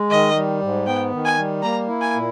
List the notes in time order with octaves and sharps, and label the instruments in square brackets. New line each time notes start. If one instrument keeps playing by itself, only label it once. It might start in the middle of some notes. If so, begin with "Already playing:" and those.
Already playing: [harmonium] G#3
[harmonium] D#3 [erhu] D#5
[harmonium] G3
G#2
[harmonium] B3 [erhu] G5
[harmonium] D#3
[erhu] G#5
[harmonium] G3
[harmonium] A#3 [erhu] A#5
[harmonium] E4
[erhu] G#5
[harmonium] A#2